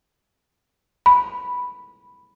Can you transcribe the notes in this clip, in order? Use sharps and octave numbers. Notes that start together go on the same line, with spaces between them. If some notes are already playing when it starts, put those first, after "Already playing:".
B5